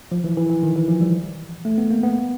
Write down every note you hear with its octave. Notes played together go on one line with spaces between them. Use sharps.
F3
E3
E3
E3
D#3
E3
F3
G3
A3
B3
A#3
B3